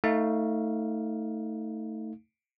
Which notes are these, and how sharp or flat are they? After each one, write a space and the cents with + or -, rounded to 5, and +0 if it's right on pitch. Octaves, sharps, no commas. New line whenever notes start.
A3 +15 D#4 +30 F5 +0